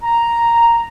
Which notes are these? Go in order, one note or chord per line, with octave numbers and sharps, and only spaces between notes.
A#5